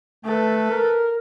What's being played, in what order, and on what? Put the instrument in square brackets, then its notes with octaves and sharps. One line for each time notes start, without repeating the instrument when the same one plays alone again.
[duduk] A3 [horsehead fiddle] A4 B4
[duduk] A#4